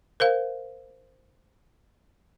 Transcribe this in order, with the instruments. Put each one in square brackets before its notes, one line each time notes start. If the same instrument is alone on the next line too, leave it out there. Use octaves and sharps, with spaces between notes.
[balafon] A#4 C5 F5